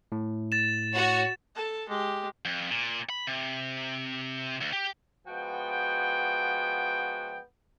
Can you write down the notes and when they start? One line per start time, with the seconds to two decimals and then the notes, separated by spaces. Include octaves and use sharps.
0.12 A2
0.52 A6 E7
0.93 F#4 C#5 F#5
1.55 A4 A5
1.89 G#3 G4
2.45 F2
2.70 A#2
3.10 B5
3.27 C3
4.61 D2
4.73 G4
5.27 F3 G#3 B3 F#4 G5